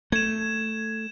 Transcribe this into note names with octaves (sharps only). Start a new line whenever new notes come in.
A3 G#6 E7